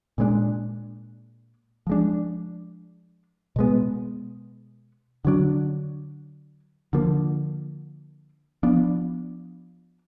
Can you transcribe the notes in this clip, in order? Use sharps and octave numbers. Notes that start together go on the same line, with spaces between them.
A#2 G#3 B3 D4
F3 G#3 D4
B2 G#3 B3
D3 F#3 D4
D3 F3 A#3
F3 B3 D4